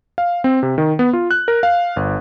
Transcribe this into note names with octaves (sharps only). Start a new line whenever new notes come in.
F5
C4
C3
D#3
B3
F4
F#6
A#4
F5
G1